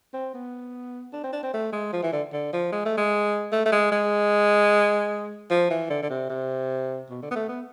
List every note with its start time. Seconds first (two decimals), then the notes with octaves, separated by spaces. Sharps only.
0.14 C4
0.34 B3
1.13 D4
1.24 C4
1.33 D4
1.43 C4
1.54 A3
1.72 G#3
1.93 F3
2.03 E3
2.13 D3
2.33 D3
2.53 F3
2.72 G#3
2.85 A3
2.97 G#3
3.52 A3
3.66 A3
3.72 G#3
3.92 G#3
5.50 F3
5.70 E3
5.90 D3
6.03 D3
6.10 C3
6.30 C3
7.10 B2
7.23 D3
7.31 B3
7.36 A3
7.49 B3